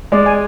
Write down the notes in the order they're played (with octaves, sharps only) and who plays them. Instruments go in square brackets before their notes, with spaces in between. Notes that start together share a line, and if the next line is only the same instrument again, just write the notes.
[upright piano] G#3 [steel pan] D5
[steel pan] G#5